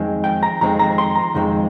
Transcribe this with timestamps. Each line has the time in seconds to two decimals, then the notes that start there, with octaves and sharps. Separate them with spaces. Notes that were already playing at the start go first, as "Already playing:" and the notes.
Already playing: F2 D#3 G#3 C4
0.24 G5
0.43 A#5
0.61 F2 D#3 G#3 C4 A#5
0.79 A#5
0.98 C6
1.15 A#5
1.35 F2 D#3 G#3 C4